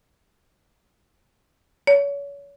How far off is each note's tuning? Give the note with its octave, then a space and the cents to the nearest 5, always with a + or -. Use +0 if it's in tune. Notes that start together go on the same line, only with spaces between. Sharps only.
C#5 +35